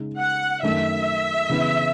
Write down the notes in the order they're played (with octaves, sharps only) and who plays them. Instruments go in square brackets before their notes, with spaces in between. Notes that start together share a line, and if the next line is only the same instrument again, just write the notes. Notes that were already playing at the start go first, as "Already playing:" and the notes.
Already playing: [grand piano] C#3 G#3 D#4
[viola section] F#5
[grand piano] F#2 D#3 A3 C#4 [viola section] E5
[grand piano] C#3 E3 B3 E4